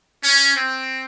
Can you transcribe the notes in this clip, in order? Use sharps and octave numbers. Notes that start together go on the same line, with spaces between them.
C#4
C4